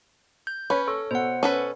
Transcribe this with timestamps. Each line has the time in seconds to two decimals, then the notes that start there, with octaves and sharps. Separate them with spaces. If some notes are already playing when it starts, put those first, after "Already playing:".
0.47 G6
0.70 C#4 B4 C#5
0.88 A4 C#6
1.11 B2 C5 F#5
1.43 C#4 A4 B4